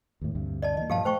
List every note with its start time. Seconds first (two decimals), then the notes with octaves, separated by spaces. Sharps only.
0.21 D#2 A2
0.35 D2 G2 C3
0.62 D5 D#5 A5
0.77 E3 A#3 D#5
0.90 G2 A#2 F3 G4 F5 A5
1.05 A3 C5 G5 C#6